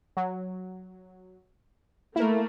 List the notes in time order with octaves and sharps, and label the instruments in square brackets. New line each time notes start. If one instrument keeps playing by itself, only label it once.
[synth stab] F#3
[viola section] A3 A#3 [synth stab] E4 A#4